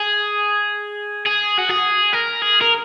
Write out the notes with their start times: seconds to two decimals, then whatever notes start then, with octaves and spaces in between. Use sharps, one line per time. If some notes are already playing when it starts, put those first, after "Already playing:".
Already playing: G#4
1.26 G#4
1.58 F#4
1.70 G#4
2.13 A#4
2.42 G#4
2.61 A#4